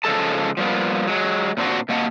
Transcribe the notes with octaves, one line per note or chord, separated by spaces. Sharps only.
C#3 F3 G#3 A4 A5
F3 G3 A#3 B3
F#3 G#3
A#2 C4 D4 F#4
C3 A#3 D#5 F#5 A5